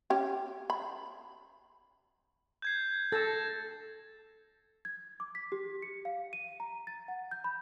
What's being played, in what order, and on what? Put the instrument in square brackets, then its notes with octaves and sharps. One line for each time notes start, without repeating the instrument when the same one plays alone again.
[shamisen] C#4 G4
B5
[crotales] G6 G#6 C7
[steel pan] A4 [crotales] A6 A#6 E7
[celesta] G#6
D6
B6
G4
C#7
F5
D#7
A#5
A6
F#5
G6
B5